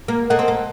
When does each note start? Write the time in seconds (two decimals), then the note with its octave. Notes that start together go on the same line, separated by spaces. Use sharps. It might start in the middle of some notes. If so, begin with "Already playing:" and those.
0.08 A#3
0.30 A#3 A4 D#5 F#5
0.39 C4
0.48 A#3